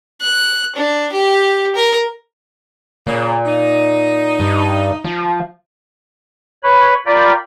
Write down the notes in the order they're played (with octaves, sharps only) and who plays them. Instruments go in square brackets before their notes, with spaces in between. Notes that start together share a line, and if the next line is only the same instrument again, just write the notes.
[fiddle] F#6
D4
G4
A#4
[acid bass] A#2 [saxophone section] C#3 A#3
[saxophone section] D#4
[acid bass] G2
F3
[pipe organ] B4 C#5 B5
F4 A#4 D5 G5 B5